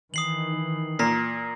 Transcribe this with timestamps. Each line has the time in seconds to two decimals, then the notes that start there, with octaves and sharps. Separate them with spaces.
0.14 D#3 E3 D#6 C7 F#7
0.99 A#2 A#5 A#6 C7